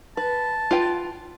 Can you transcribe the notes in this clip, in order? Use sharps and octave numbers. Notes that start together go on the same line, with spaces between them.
B4 A5
F4 B4 G5